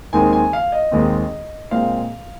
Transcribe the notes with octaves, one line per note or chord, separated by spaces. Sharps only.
D#2 D#3 G#3 C4 G#5
G#5
F5
D#5
D#2 D#3 G#3 C4
A#2 G#3 C4 F5